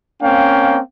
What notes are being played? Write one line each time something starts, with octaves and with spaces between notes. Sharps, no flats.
A#3 C4 C#4 F5 G5